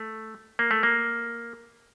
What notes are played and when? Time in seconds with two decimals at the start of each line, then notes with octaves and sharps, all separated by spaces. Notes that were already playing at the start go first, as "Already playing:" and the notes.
Already playing: A3
0.59 A#3
0.71 A3
0.83 A#3